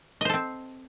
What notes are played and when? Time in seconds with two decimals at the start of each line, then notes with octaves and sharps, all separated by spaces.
0.21 D#5
0.25 C5
0.29 A4
0.34 C4